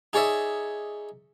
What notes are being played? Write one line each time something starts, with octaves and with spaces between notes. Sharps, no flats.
D#4 G#4 C#5 D5 E5